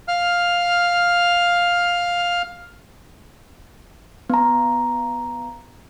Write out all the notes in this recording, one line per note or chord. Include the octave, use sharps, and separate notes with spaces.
F5 F6
B3 A#5